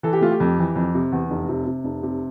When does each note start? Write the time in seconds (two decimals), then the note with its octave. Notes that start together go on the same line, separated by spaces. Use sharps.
0.03 E3 A4
0.13 G4
0.21 A3 F4
0.31 G4
0.40 F2
0.59 E3
0.76 F2
0.94 C3
1.12 E2
1.30 F1
1.49 C3
1.66 C3
1.84 F1
2.03 C3